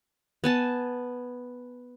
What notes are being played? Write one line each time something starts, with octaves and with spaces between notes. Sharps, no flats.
B3 G#5 A5